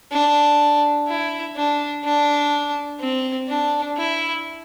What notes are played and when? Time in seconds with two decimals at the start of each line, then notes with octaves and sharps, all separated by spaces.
0.12 D4
1.08 E4
1.56 D4
2.04 D4
3.00 C4
3.48 D4
3.97 E4